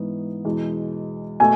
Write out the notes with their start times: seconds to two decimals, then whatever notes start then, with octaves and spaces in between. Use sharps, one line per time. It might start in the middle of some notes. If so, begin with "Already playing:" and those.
Already playing: G#2 E3 B3 D#4
0.45 E2 B2 G#3
1.40 B2 A3 G#5